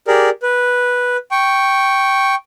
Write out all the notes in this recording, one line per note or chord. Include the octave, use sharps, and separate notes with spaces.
G4 G#4 A#4 D5
B4
G5 C#6